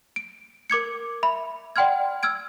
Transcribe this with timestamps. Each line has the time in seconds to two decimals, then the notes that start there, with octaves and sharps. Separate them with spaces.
0.16 D7
0.70 A#4 D6 G#6 C#7
1.23 E5 B5
1.76 D5 F#5 G5 C6 F6 G#6
2.23 E6 F6 G#6 D7